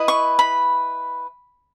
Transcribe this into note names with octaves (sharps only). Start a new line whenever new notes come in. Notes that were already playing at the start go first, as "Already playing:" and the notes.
Already playing: E4 B4 D#5
C#6
B5